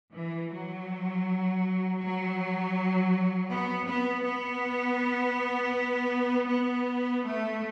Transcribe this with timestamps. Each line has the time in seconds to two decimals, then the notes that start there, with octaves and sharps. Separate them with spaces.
0.13 E3
0.51 F#3
2.00 F#3
3.50 B3
3.87 B3
4.25 B3
6.49 B3
7.24 A3